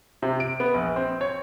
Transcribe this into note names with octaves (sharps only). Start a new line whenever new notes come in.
C3
D7
B3
A#1
C4
C#5